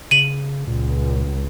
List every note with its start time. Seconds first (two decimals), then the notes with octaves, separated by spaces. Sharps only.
0.11 C#3 D#7 F#7
0.67 C#2 A#2